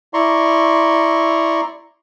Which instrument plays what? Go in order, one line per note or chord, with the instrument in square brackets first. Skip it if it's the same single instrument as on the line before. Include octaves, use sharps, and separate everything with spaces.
[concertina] E4 D5 A#5 C6 C#6